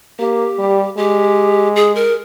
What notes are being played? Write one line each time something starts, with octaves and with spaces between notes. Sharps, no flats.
A#3 G4
G3
G#3 G4
G#4
A#4